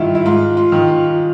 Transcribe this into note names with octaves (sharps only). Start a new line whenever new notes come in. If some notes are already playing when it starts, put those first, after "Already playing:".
Already playing: G2 D#3 E4 F4
E4
G#2 F4
F4
D#3
F4